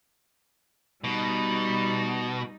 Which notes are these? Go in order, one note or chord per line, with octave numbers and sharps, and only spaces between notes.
B2 G3 D#4